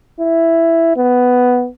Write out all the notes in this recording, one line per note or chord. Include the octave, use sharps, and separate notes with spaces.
E4
B3